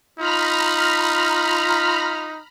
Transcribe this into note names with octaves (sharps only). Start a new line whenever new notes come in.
D#4 F4 A#5 B5 F6